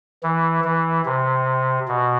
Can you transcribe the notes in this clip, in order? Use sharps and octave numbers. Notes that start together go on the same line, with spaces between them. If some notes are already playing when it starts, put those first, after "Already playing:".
E3
E3
C3
B2